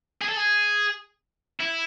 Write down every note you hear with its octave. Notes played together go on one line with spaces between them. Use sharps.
G#4
A4
G#4
E4